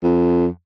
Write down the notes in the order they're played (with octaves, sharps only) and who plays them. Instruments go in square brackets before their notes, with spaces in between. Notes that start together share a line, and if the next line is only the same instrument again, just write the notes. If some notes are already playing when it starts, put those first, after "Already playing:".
[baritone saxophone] F2